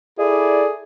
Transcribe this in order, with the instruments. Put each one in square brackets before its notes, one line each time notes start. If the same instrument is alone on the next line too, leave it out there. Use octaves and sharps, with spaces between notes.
[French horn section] E4 A4 D5 [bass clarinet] G#4